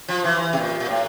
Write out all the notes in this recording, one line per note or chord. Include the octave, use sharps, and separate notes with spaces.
F3
E3
C3
A#2
A#2
A2